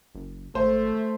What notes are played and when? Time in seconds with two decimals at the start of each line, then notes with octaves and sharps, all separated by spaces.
0.15 F#1
0.55 G#1 A3 C5